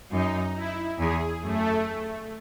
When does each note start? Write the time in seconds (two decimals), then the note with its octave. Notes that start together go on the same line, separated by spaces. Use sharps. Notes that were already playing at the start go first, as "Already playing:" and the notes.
0.11 F#2 D#4
0.55 E4
0.99 E2 G#4
1.42 F#2 A3